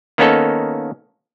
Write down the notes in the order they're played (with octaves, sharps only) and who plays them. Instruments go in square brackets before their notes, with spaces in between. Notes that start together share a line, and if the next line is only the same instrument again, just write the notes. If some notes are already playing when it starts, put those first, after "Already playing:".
[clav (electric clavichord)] D#3 A#3 B3 C#4 D#4 A4